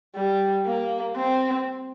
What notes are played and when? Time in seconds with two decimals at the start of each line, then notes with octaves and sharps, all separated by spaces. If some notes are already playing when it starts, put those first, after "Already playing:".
0.16 G3
0.66 A#3
1.16 C4